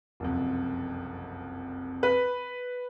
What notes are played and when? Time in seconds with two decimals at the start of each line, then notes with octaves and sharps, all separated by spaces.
0.20 F#1 C2 F2
2.03 B4